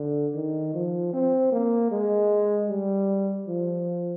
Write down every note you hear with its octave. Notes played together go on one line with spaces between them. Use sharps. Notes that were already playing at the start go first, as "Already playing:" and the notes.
Already playing: D3
D#3
F3
C4
A#3
G#3
G3
F3